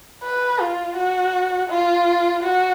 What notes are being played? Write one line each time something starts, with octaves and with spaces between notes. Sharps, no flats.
B4
F4
F#4
F4
F#4